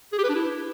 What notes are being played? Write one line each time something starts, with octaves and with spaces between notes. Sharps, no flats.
G#4
G4
B4
D4
E4